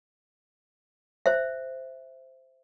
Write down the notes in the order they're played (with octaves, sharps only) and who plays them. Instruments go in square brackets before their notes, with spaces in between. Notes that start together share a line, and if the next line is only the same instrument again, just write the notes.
[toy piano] C5 E5